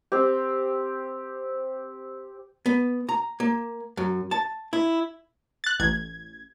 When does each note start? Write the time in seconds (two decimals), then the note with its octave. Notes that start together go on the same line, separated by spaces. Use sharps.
0.12 C4 G4
2.66 B3
3.09 A#5
3.40 A#3
3.97 F#2
4.31 A5
4.73 E4
5.64 F#6 A6
5.80 A1 G#6